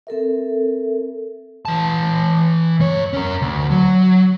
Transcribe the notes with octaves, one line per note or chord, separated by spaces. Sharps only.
C4 A4 A#4 E5
E3 A5
G2 C#5
C#4 A#4
D2
F#3